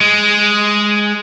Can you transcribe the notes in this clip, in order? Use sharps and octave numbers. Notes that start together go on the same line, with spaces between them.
G#3